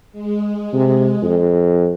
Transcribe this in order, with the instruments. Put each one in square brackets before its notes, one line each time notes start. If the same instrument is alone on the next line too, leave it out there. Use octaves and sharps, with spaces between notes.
[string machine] G#3
[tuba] C3
F2